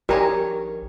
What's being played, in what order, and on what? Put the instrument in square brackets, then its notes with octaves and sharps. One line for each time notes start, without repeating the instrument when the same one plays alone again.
[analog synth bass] A#1 [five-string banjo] D#3 C#5 G#5 [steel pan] G4 A#5 [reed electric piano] A#4